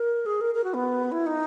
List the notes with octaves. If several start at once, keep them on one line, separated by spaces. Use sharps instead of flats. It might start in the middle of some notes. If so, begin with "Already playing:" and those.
Already playing: A#4
G#4
A#4
A#4
F#4
B3
E4
D#4